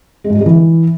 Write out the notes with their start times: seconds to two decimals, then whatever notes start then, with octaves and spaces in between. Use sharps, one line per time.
0.24 G#3
0.30 G#2
0.35 G3
0.40 G#3
0.46 E3